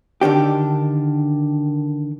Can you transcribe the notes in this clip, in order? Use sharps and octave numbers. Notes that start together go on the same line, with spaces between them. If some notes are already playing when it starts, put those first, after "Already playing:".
D3 D#3 D4 G4